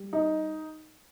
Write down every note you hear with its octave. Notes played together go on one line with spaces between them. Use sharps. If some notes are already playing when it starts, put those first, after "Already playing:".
Already playing: G3
D#4